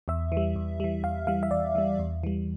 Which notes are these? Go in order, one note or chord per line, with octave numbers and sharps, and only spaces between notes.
E2 E5
E3
G3
E2
E3 G3
E2 F5
E3 G3 F5
E5
E2 D5
E3 G3
E2
E3 G3